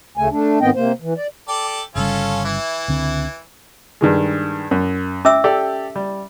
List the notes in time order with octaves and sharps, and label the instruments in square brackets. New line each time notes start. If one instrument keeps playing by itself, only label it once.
[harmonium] D2 C#3 A3 G#5
A3 D4
G#2 D#3 B3 C4 D#5 G5
C3 A#3 C5
E3
D5
[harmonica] G4 A4 D5
[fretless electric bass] G1 C#3 G3 [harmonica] C#4 F4 A4
[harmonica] E3 E4
[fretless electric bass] C#2 D3 C4
[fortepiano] G2 D#3 G#3
F#2
[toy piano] C#4 E5 E6 [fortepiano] D6
[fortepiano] G4 A4 D5
G3